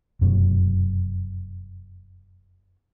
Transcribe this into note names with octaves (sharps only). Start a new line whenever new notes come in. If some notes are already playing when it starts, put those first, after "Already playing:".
F1 F#2 B2 F#3